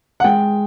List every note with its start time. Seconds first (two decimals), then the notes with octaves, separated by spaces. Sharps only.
0.20 F#5
0.24 G#3 G5